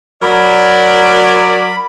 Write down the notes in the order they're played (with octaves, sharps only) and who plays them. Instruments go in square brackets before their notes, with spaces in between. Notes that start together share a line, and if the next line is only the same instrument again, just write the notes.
[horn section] F#3 A#4 D5 [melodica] B5